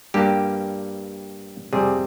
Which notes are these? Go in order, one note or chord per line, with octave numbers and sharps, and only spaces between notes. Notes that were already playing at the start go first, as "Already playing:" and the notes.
G2 G3 A#3 G4
F2 C3 G3 G#4